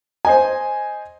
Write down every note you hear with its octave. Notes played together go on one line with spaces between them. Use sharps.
C5 D#5 G#5